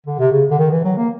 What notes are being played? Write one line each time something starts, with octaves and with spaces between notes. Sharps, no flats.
D3
C3
C#3
D3
D#3
E3
F#3
A#3